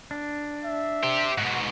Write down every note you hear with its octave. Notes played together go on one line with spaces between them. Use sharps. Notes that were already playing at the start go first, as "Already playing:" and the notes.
D4
E5
G4 C5
G#2 B2 F#4 F#5